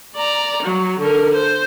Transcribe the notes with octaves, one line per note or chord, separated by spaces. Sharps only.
D5 A#5
F#3
D3 A#4
C5